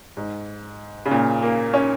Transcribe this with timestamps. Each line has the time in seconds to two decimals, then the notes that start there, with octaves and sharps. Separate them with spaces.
0.17 G#2
1.06 C#3
1.11 A#2
1.43 A#3
1.74 C#4